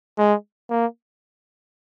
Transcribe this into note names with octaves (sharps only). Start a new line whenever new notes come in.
G#3
A#3